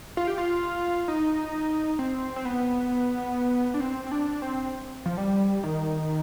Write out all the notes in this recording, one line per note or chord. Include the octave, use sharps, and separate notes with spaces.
F4
G4
F4
D#4
C4
C4
B3
D4
C4
C4
D4
C4
F3
G3
D#3